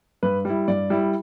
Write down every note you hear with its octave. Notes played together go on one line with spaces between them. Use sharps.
G2 B4
G3 E4
G2 D5
G3 E4